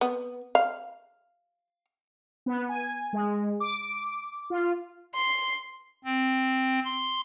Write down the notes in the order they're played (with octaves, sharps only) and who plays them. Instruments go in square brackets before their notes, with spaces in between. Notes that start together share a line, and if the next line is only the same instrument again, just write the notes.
[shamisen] B3
F5
[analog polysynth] B3
G#5
G#3
D6
F4
[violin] C6
[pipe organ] C4
C6